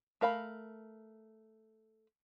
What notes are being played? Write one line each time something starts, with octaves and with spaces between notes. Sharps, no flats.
A3 A#4 F5 B5